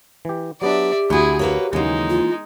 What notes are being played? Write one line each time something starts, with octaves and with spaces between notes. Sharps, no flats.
E3 G4
F#3 B3 D4 G4 D5 E5
D2 A3 E4 F#4 G#4
A#3 F#4 B4 C#5
D#2 C#3 E3 F#3 G#3 A#3 D#4
F4